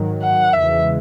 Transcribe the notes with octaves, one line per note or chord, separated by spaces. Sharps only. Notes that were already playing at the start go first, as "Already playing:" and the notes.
Already playing: G#2 D#3 F#3
F#5
E2 C#3 E3 G#3 E5